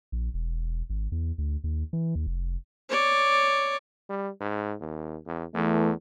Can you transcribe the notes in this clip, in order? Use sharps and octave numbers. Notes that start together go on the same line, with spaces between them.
A#1
E1
G#1
E2
D2
D#2
E3
D#2
F1
C#5 D5
G3
G#2
D#2
E2
E2 E3 A3